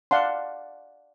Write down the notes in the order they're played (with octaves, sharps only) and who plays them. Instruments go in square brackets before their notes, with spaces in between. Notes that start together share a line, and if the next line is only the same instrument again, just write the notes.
[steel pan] D5 F5 F#5 A5 C6